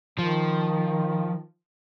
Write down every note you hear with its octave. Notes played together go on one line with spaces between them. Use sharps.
D#3 F3